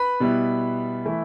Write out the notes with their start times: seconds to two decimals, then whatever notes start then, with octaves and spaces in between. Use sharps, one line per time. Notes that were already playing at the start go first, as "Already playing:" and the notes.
Already playing: B4 B5
0.20 B2 G3 B3 E4
1.05 E3 A3 E4